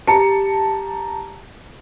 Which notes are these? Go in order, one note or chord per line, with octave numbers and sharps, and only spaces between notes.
G4 A5 A#5 C#7